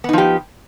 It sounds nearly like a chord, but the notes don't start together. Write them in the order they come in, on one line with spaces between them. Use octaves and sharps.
B3 D#4 F3 G4